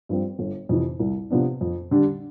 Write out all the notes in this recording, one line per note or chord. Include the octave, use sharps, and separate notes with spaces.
G2 F3 C4
G1
F2 C3 E3
C2
C3 F3 B3 D4
F2
D3 G3 D4